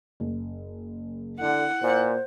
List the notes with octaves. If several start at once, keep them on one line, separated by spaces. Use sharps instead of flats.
F#1
D3 E4 F#5
A#2 C5